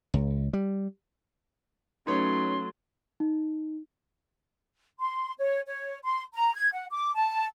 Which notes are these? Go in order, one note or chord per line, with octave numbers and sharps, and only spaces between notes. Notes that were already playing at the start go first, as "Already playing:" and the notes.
C#2
G3
F#3 A3 C#4 D#4 B4 C#5 C6
D#4
C6
C#5
C#5
C6
A#5
G#6
F#5
D6
A5